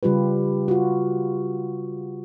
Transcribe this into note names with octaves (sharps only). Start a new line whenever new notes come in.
C#3 G3 F4 G4 B4
F4 F#4